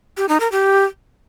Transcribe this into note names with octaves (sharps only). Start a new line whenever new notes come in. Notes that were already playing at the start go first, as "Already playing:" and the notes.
G4
D#4
A#4
G4